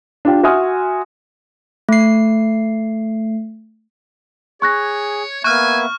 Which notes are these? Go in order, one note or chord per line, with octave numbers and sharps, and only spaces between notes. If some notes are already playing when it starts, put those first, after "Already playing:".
D4 F4 G4
F#4 E5 G#5 C6 D#6 F6
A3 C7
G#4 C#5 C#6 F#6 A#6
A#3 B3 E5 G#5 C#6 F6 F#6